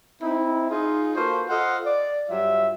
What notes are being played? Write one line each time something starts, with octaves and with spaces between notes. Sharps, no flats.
C4 D#4 E4
D#4 F4 G#4
A#3 F4 F#4 A4 B4 C5
F4 A4 C5 D#5 F5 F#5
D5
G2 F#3 G3 F4 E5